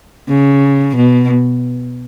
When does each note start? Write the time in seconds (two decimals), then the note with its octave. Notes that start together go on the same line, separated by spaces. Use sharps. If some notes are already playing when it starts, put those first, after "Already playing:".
0.29 C#3
0.97 B2